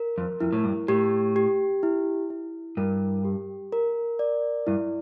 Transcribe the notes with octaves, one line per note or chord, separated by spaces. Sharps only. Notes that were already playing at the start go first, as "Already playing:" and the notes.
Already playing: A#4
F2
F2 E4
A2
G2
A2 G4
G4
E4
E4
G2 A#4
G4
A#4
D5
G2 E4